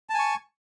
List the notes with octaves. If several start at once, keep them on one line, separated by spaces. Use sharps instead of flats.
G#5 A5 C#6